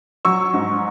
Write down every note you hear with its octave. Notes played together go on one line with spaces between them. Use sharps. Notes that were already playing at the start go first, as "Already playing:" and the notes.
F#3 C#6 E6
G#2